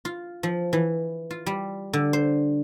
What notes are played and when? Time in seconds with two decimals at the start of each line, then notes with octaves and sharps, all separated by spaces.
0.05 F4
0.43 F3
0.73 E3
1.31 F4
1.46 G3
1.93 D3
2.13 C5